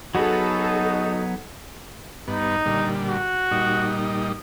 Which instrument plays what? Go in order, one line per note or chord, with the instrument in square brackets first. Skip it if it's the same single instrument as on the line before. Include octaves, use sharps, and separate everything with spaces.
[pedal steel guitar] F#3 B3 B5 [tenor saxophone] D#4 [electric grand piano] F#4 [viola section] G#4 A4
[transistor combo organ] G2 B3 [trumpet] D#4
[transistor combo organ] A#2 D3 G3
[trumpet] F#4
[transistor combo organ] A#2 G3 D#4